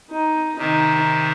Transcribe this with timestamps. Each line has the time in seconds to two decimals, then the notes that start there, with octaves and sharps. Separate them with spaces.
0.11 D#4
0.58 C3 D#3 D#4